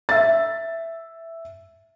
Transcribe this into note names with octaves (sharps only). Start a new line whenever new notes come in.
E5 A6